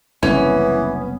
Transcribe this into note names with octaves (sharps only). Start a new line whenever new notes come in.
F#1 C2 E3 B3 C#4